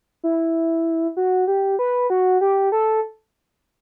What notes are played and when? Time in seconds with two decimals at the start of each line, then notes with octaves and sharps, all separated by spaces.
0.24 E4
1.17 F#4
1.48 G4
1.79 B4
2.10 F#4
2.41 G4
2.72 A4